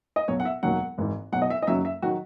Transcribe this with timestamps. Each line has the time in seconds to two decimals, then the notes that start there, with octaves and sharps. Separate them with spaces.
0.16 D#5
0.28 B1 B2 F#3 C#5
0.40 F#5
0.45 E5
0.63 E1 D#2 D#3 F#3 F#5
0.98 G#1 G#2 E3
1.32 B1 B2 F#3 F#5
1.42 D#5
1.50 E5
1.62 D#5
1.67 F#1 F#2 D#3 F#3 E5
1.85 E5
2.02 D#3 F#3 F#4